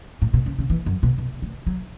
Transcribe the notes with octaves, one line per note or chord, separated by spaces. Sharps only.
A2
B2
C#3
C#3
E3
F#2
B2
B2
A3
F#3